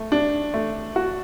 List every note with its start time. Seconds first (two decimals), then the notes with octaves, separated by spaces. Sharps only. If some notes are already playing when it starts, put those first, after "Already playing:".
Already playing: A3
0.12 D4
0.54 A3
0.96 F#4